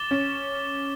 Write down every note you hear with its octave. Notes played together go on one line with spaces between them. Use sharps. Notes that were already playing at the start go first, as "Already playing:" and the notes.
Already playing: D6 A6 E7 G7
C#4